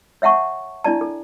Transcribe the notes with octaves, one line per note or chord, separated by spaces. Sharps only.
C#5 E5 F#5 A5 C#6
D4 E4 D5 A5
A4